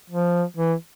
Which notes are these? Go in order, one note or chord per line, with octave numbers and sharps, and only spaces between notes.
F3
E3